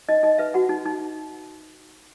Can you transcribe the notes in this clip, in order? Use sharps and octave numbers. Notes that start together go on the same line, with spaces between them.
D#4 D#5
D#4 D#5
B4 E5
F#4 F#5
D#4
D#4